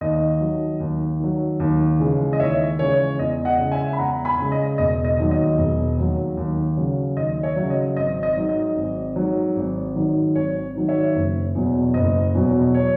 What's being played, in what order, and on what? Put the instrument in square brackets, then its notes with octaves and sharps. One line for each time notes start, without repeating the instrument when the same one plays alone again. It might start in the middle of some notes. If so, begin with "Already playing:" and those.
[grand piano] D#2 D#5
D#3 F#3
D#2
D#3 F#3
D#2
C#3 E3 G#3
D#5
D#2 C#5 E5
C#3 E3 G#3 C#5
E2 D#5
D#5 F#5
C#3 G#3
E5 G#5
B5
E2 F#5 A#5
G#5 B5
C#3 G#3
D#5
E1 D#5
D#5
D#2 D#3 F#3
D#5
E1
D#2 D#3 F#3
D#2
C#3 F#3
D#2 D#5
C#5 E5
C#3 F#3
D#5
G#1 D#5
D#5
G#2 F#3
D#5
G#1
G#2 F#3
G#1
G#2 D#3 F#3
G#1 C#5
G#2 D#3 F#3
C#5 E5
F#1
E2 B2 F#3
F#1 D#5
E2 B2 F#3
C#5